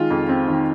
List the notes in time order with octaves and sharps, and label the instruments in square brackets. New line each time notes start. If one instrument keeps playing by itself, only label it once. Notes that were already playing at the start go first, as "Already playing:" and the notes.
Already playing: [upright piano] D#3 G#3 F4
F2
C4
D#3